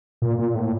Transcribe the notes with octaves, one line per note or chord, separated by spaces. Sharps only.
A#2
A#2
A2